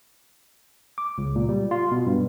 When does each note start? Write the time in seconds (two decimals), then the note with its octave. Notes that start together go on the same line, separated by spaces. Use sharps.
0.98 D6
1.18 C#2
1.36 A#2
1.49 G3
1.71 F4
1.91 B2
2.07 G2